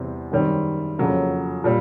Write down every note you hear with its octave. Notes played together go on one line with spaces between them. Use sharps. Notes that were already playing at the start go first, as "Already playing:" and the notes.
Already playing: E2 C3 E3 G3 C4
F#2 D#3 G3 C4
F2 C#3 F#3 A#3
A#2 G3